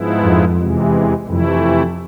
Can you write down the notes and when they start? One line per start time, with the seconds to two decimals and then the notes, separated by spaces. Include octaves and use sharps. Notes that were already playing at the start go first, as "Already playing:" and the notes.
Already playing: G#2 F3 G#3 B3 E4
0.23 F2
0.58 E2 C3 E3 G#3
1.27 F2 C3 E3 A3 E4